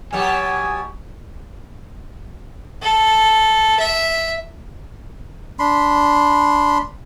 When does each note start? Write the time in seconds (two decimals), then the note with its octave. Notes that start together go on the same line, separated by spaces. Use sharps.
0.13 B2 F#3 G4 G#5
2.82 A4
3.79 E5
5.59 D4 B5 C6